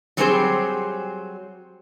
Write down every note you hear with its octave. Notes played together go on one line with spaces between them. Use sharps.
F#3 G3 C4 G4 G#4 C5